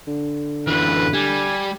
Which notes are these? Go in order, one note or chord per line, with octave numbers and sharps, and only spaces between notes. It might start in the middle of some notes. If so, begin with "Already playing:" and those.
D3
F#2 E3 B4
G3 G#5